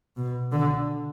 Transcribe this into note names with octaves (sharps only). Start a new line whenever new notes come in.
B2
D3